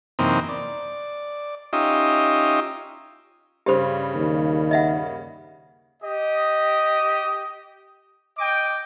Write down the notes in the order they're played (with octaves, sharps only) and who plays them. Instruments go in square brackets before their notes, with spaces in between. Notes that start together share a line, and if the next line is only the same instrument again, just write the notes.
[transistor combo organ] F#2 C3 E3 A#3 C4 D#4
D5
C#4 D#4 F4 G4 D#5 E5
[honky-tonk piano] G2 C#3 [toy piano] G4 C5
[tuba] D#2
[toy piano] D#5 E5 F#5
[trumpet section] G4 D#5
D#5 G5 D6